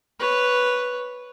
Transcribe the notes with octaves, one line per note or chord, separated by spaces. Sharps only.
B4 C#5